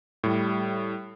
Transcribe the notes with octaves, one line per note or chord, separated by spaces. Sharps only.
A2 G3